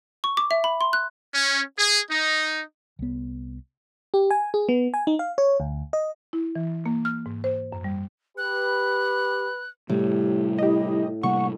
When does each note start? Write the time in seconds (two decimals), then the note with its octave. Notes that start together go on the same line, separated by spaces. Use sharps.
0.24 C#6
0.37 D6
0.51 E5
0.64 B5
0.81 C6
0.93 F#6
1.34 C#4
1.78 G#4
2.10 D#4
2.99 C2 B3
4.14 G4
4.31 G#5
4.54 G#4
4.69 B3
4.94 G#5
5.07 D#4
5.19 F5
5.38 C#5
5.60 D2
5.93 D#5
6.33 E4
6.56 E3
6.86 A#3
7.05 F6
7.26 G#2
7.44 C5
7.72 F#2
7.84 G3
8.38 G4 B4 F#6
9.90 A2 C3 G3 A3 G4
10.58 E4 G4 D#5
11.23 C3 G3 A#3 F#5 C#6